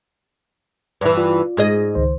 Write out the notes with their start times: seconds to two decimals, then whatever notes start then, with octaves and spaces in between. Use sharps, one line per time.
1.01 G2 E3 B4 E5
1.17 F4 D5
1.57 G#2 G#4 D#5
1.95 C#2 D#3 C5